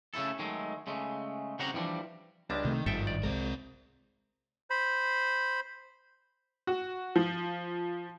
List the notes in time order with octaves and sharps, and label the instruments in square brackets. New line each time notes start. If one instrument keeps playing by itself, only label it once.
[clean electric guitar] C#3 A3 E4 A4
D#3 F#3 G#3 A3
C#3 G#3 A3
C#3 G3 C4 F#4 F#5 A#5
E3 F3 G3 D4
[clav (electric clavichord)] C#2 G3 G#3 [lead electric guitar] D4
[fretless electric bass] C3 A3 [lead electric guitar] D#3
[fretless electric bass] G#1 [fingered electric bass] G2 [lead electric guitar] D#3 F3 [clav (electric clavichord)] A4 E5 G5
[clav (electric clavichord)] D5
[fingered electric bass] C2 G#3 [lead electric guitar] C4 A#4
[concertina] C5 B5
[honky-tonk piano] F#4
F3